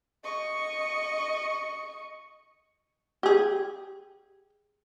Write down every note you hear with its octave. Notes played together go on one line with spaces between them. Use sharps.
D#5 C#6
G4 G#4